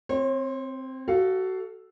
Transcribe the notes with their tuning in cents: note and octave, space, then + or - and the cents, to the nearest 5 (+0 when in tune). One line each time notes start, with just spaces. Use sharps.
C4 +0 C#5 -40
F#4 +25 A4 +0 F5 +0